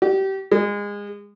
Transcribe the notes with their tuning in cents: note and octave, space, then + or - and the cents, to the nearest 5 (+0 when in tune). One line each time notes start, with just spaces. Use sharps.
G4 -25
G#3 -25